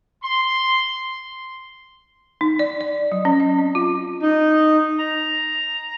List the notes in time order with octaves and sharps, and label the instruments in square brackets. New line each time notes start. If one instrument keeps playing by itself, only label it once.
[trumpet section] C6
[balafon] D#4
D5
D5
F#3
C#4
D#5
C4
F4
[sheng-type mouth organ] D#4
A#5